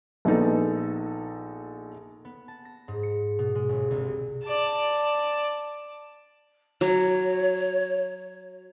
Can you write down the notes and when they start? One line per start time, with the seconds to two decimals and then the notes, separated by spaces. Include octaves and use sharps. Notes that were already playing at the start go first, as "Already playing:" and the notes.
0.25 A#1 B3 D#4 A4
2.25 B3
2.48 A5
2.65 A#6
2.88 G#2
3.03 C#7
3.39 B2
3.55 G#3
3.69 G1
3.91 C2
4.45 D5 A5
6.81 F#3 C#5